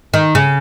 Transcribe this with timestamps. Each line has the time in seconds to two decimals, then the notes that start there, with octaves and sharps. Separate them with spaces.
0.14 D#3
0.35 C#3